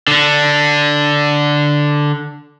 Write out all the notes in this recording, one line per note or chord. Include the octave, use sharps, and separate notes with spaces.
D3 D4